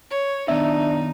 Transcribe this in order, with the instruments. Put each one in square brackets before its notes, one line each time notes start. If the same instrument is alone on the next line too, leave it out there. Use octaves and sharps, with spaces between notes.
[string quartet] C#5
[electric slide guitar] D#3 B3 D5 [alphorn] D4 [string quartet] D#4 [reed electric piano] E5